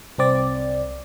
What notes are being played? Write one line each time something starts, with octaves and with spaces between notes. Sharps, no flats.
C2 C4 D5